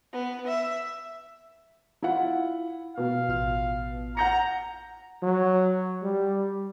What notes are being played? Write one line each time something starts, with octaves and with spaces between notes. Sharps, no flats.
B3
E5
E4 F4 F#5
B2 F5
A1 F4 F6
F#5 A#5 G6 C#7
F#3
G3